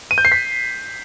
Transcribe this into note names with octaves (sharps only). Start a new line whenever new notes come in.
D#7
G6
C7
B6